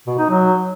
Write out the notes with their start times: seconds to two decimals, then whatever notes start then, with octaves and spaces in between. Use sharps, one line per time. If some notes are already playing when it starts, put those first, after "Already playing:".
0.07 B2
0.18 D#4
0.30 F#3